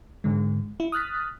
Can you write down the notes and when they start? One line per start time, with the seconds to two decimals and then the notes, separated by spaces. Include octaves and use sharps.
0.24 G#2 D3 G#3
0.80 E4
0.92 D#6 F6 F#6 A6 B6